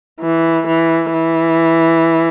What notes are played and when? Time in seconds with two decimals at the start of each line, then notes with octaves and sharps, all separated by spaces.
0.20 E3
0.67 E3
1.13 E3